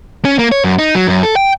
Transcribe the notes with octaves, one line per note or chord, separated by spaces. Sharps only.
C#4
A#3
C#5
F#2
D#4
F#3
F#2
A4
G5